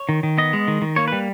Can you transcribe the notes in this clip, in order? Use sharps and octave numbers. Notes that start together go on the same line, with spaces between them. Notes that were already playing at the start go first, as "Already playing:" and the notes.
Already playing: C#5
D#3
D#3
B3 D#5
G#3
D#3
D#3
A#3 C#5
G3 B4